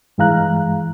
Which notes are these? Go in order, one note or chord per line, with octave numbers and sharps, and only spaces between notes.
G2 E3 G#3 F5 A#5 F#6